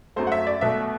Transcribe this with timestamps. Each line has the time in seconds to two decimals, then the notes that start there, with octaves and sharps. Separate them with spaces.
0.16 F#2 F#3 A3 C5
0.27 F#5
0.32 E5
0.47 D5
0.61 B2 A3 E5